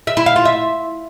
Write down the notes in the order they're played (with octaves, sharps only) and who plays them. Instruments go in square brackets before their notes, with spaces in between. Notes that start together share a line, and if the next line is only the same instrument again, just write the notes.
[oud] E5
E4
F5
F4
E5